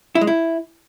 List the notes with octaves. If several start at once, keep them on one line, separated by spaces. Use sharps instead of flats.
E4
G#3
E4